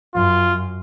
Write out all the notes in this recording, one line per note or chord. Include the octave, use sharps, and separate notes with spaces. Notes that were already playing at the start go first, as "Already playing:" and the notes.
F#2 F4